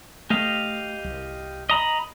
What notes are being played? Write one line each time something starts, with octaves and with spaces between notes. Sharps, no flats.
A3 G4 D#5 F5
C2
D#5 A#5 B5